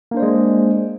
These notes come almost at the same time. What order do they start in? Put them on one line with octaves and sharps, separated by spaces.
A#3 D4 C5 D5 G#3